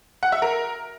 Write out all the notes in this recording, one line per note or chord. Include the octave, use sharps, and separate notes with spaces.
F#5
E5
A#4